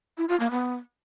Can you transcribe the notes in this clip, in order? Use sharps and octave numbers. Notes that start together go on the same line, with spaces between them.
E4
F4
A#3
B3